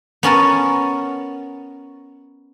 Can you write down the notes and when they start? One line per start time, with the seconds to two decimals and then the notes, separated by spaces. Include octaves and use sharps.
0.23 B3 C#4 A#4 A5